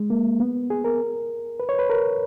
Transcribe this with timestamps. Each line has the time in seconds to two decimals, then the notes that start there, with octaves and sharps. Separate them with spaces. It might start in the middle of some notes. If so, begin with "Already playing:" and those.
Already playing: G#3
0.10 A#3
0.40 B3
0.70 G#4
0.84 A#4
1.60 B4
1.69 C#5
1.79 B4
1.90 A#4